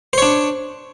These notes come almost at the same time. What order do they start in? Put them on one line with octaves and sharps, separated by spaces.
C5 C#5 D4